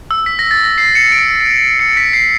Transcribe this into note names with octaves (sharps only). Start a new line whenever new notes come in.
E6
B6
A#6
A6
A#6
C7
C#7
D7
C#7
B6
C7